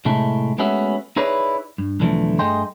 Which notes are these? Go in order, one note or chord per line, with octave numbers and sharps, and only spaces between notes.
A2 C3 G#3 A3 E4
G#3 A3 B3 C#4 F#4 E5
D#4 E4 G#4 B4 C#5 D5
G2
B1 E2 D3 E3 F3 A3
G2 A3 G#4 D#5 G5 C6